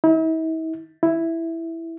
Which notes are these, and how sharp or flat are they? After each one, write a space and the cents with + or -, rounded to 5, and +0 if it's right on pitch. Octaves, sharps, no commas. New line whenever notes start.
E4 -45
E4 +0